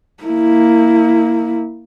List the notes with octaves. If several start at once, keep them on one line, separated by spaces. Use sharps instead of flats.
A#3 E4